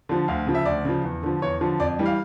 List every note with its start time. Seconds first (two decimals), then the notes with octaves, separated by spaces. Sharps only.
0.09 D3 F3
0.28 D2 F5
0.47 C#3 F3
0.55 E5
0.65 D2 D5
0.85 C#3 F3
1.04 E2
1.23 D3 F3
1.42 E2 C#5
1.61 D3 F3
1.80 F2 D5
1.99 E3 G3
2.06 F5